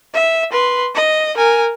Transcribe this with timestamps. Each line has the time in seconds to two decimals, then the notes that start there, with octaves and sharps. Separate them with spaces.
0.14 E5
0.52 B4 C6
0.95 D#5
1.37 A#4 G#5